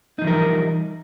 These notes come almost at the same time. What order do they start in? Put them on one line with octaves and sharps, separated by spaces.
D#4 F3 E3 A#4 G3